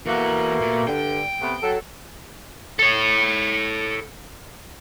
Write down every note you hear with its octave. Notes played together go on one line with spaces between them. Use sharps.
B2 E3 A3 A#3 F#5
A#2
G2 D3 G5
C3 A3 B3
F#3 A4
A4 C#5